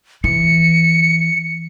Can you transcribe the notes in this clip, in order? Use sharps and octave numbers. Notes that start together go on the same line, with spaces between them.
E3 C#7